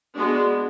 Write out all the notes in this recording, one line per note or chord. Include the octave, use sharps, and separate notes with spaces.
G#3 B3 D4 F#4